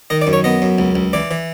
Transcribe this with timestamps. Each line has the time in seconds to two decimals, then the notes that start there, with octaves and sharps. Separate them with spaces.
0.10 D#3 D#5
0.22 D5
0.27 F#2
0.33 C#5
0.44 B3 D#5
0.62 F#2
0.79 C#2
0.95 C#2
1.13 E3 D5
1.31 E3